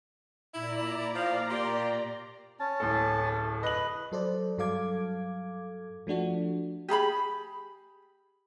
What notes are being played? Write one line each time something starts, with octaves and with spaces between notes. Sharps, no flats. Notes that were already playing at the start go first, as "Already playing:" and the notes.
A#2 E4 D5 A#5
F3 F5
A#3 G4 C6
C#4 A5
D1 A2 A4
B4 D#5 F#7
F#3 A4 C5 D5
G2 F#3 A4 F5 D6 G#6
F3 A3 D4 F#4
G4 G#4 A#5 B5